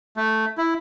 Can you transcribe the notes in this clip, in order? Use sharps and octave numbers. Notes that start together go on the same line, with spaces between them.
A3
E4